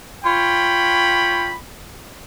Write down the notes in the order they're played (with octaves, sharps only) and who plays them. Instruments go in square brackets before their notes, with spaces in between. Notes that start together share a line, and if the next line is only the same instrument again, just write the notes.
[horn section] F4 C#5 G5 B5